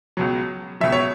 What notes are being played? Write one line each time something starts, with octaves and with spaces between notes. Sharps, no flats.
C#2 B2 F#3
C#2 B2 F#3 E5
C#5